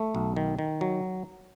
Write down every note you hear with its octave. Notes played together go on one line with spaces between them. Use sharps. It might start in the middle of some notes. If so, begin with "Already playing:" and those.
Already playing: A3
B1
D#3
D#3
F#3